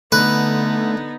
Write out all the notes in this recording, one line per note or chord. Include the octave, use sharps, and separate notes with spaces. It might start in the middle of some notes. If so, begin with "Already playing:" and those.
D3 A3 B3 D#4 B4